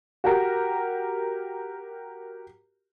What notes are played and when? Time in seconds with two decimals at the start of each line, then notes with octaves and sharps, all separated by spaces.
0.24 F#4 G4 A#4